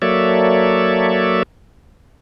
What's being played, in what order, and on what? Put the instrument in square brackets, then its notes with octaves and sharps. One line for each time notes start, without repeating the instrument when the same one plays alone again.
[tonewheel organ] F#3 A#3 A4 C#5 D5 E5